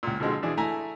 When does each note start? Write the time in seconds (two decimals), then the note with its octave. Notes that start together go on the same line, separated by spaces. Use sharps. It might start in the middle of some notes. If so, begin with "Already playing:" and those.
0.03 C#2 A#2
0.20 B2 D3 F3 G#3 C4
0.42 B2 E3 D4 G#4
0.57 A3 E4 G#5 A#5